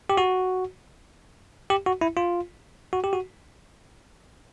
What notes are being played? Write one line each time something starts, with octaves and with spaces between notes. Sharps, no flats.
G4
F#4
G4
F#4
E4
F4
F#4
G4
F#4